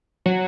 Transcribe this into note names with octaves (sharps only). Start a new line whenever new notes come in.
F#3